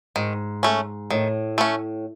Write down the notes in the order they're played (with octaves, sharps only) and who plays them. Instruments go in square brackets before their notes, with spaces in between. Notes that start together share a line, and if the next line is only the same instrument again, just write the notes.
[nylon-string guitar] G#2 [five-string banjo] D#3
[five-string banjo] A3 C#4
[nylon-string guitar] A2 [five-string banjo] D#3
[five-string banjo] A3 C#4